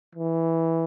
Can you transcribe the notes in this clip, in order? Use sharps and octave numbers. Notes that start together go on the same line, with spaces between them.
E3